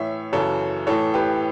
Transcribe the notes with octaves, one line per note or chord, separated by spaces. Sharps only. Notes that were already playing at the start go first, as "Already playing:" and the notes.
Already playing: A2 E3 C#5 E5
F#2 C#3 E3 A4 C#5
A2 E3 A4 C#5
G4 B4